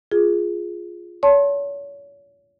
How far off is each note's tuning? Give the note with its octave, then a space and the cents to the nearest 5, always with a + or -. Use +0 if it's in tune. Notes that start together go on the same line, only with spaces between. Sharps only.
F4 +0 G#4 +0
C#5 +35 A5 +0 C6 +40